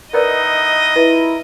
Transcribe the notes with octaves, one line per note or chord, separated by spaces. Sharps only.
D#4 E4 A#4 B4 D5 D#5 F#5
E4 F4 A#4 B4